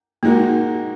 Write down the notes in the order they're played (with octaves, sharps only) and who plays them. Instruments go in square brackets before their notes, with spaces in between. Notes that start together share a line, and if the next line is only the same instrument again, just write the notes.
[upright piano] A#2 G#3 D#4 F#4 A#4 [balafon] A#3